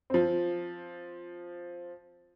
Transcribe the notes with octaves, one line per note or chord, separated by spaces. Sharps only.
F3 C4